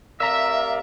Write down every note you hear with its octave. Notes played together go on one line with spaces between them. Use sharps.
C3 A3 A#4 D5 E5 F5 A#5 E6